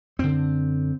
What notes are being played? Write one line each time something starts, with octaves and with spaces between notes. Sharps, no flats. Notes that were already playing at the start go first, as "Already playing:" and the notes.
F#2 D3 C4